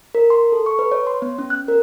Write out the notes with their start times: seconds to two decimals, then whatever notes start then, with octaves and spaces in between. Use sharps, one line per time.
0.15 A#4
0.30 C6
0.52 A4
0.66 C#6
0.79 B4
0.92 C#5
1.07 C6
1.22 B3
1.39 C#4
1.50 F#6
1.68 A#4